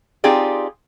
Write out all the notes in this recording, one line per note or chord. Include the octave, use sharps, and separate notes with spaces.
C4 D#4 F4 G4 G#4 D5